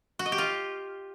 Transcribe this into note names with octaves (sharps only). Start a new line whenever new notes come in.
F#4
D#5
G4
F4